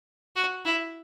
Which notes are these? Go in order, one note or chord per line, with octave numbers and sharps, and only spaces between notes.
F#4
E4